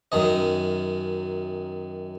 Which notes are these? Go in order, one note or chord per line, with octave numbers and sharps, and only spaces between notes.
F#2 D#3 D#5